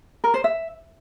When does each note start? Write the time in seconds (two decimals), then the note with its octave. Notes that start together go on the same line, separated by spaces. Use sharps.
0.24 A#4
0.34 C5
0.44 E5